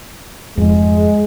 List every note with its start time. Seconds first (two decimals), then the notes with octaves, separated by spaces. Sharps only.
0.57 F1 F2 G#2 G#3